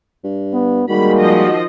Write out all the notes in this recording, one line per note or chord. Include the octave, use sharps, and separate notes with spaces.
G2
B3
D#3 G3 G#3 A#3 F#4 B5
F3 D#5